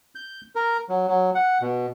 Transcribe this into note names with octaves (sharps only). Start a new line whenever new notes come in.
G6
A#4
F#3
F#3
F#5
B2